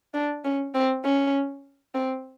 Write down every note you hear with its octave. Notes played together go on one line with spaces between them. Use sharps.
D4
C#4
C4
C#4
C4